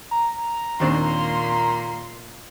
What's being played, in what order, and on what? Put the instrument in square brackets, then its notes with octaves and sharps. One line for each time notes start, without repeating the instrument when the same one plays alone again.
[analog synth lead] A#5
[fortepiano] D#2 C4 D4 [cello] A#2 A#3 [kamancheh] C6